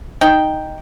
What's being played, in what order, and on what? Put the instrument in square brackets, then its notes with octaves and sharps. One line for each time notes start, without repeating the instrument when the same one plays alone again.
[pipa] D#4 G5